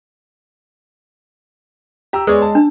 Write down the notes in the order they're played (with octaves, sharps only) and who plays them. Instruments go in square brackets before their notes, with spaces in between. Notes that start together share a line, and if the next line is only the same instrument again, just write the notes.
[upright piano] G4 A#5 E6
[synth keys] G#3 [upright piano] B3 C#5 D5
[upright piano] A5
[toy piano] D4